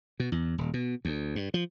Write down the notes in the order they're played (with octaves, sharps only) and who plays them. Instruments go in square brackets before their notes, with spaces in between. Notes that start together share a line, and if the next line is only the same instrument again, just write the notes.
[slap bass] B2
E2
D#1
B2
D2
G2
F3